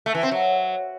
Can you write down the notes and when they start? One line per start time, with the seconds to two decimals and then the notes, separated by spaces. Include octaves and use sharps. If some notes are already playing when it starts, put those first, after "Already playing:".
0.06 A3
0.15 E3
0.23 C4
0.32 F#3